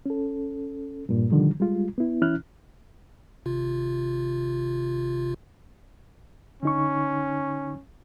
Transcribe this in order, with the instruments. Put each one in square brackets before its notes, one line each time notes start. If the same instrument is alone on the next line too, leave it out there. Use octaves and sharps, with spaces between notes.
[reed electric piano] C#4 A4
G2 A#2
B2 D3 D#3 F3 G3
G3 G#3 F4
B3 E4
E3 C#4 E4 F6 F#6
[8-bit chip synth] G#1 C3 F4
[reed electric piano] D3 D#4 C#6 [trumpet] C#4